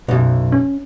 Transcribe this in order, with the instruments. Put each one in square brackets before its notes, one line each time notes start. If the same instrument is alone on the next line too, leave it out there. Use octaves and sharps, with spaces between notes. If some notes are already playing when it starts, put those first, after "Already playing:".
[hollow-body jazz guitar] B1 F#2 [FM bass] B2
[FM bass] C#4